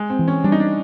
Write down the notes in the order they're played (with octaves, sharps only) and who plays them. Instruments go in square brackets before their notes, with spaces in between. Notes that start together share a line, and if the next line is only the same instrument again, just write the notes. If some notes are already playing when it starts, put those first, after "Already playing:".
Already playing: [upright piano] G#3
C4
[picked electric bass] E3
[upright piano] C#4
[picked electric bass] G3 [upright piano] D4
[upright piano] D#4
D4